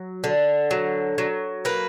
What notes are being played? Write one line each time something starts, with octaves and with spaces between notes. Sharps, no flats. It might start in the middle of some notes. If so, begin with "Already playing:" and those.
Already playing: F#3
D3
F#3
F#3
A#3 B4